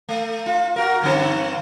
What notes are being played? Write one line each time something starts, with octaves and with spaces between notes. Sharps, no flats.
A3
F4
F#4 A#4
G2 D3 C4